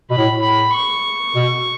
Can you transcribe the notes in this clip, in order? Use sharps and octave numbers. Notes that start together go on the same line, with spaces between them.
B2 B5
A2
A2
B5
C#6
B2